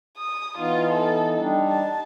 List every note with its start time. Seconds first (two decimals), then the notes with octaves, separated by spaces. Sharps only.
0.18 D#6
0.58 E3 B3 D#4 F4
0.92 A4
1.37 G3 D4 D#4
1.70 A5